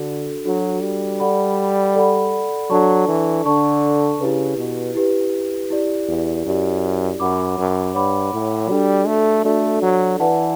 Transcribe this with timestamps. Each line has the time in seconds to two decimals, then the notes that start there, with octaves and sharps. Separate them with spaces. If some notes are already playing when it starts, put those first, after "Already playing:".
Already playing: D3 D4 F#4 A4
0.45 F#3 D4 F#4 A4
0.82 G3
1.20 A4 D5 F#5 B5
1.96 A4 D5 F#5 B5
2.70 F#3 D4 A4 D5 A5 C#6
3.08 E3
3.46 D3 D4 A4 D5 A5 C#6
4.20 C#3 E4 G4 B4
4.58 B2
4.95 E4 G4 B4
5.70 E4 G4 D5
6.08 E2
6.45 F#2 E4 G4 D5
7.20 F#2 C#5 F#5 B5 D6
7.58 F#2
7.94 G2 C#5 F#5 B5 D6
8.33 A2
8.69 G3 D4 F#4 A4 D5
9.07 A3
9.45 A3 D4 F#4 A4 D5
9.82 F#3
10.20 E3 B4 D5 F#5 A5